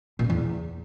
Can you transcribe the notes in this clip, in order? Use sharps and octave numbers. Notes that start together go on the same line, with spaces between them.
A#2
C#3
E2